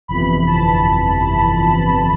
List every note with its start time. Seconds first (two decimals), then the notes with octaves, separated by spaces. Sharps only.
0.08 G1 F2 C3 E3 B5
0.47 A5